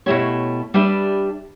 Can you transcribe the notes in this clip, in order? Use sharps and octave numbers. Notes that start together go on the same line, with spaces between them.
B2 A3 E4 G4 C#5
G3 D4 G4 B4 E5